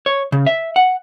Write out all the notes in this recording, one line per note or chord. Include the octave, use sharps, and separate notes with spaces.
C#5
C#3
E5
F#5